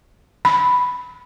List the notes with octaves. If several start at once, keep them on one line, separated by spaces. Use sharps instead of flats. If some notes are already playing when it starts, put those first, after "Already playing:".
B5